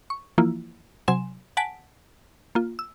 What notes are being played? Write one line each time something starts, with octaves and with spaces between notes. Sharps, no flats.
C#6
E3 F3 A#3 E4 F4
C3 F#3 G#5 C6 E7
F#5 G#5 A5 B6 D7
A#3 F4
E6